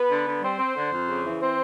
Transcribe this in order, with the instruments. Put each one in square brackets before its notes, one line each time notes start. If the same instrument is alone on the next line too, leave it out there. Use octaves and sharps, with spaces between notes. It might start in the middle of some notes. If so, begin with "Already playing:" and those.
Already playing: [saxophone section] B3 B4
D3
D3
G3 C4 C5
C4
D3
F2
C#3
E3
C4 C5